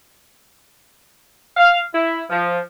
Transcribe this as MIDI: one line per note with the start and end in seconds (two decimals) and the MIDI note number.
1.56 1.79 77
1.93 2.22 64
2.30 2.59 53